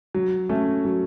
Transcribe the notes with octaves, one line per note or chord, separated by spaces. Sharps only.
F#3
A3 C#4
F#3